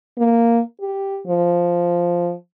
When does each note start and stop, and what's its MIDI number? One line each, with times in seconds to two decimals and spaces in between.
0.18 0.60 58
0.81 1.18 67
1.27 2.33 53